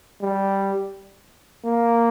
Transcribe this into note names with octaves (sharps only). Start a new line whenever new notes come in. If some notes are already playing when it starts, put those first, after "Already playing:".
G3
A#3